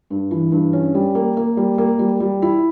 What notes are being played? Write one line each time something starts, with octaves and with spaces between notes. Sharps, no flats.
G2
E3
G2
C#4
G3
A#3
A#3
G3
A#3
G3
G3
E4